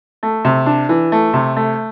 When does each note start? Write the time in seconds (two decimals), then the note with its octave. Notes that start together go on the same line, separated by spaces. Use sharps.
0.23 A3
0.45 C3
0.66 D4
0.89 E3
1.12 A3
1.34 C3
1.56 A3